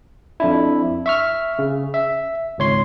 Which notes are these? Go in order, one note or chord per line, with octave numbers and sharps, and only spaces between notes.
F2 D4 E4
E5 C#6 F6
C#3
E5
G#1 C#2 C#5 C6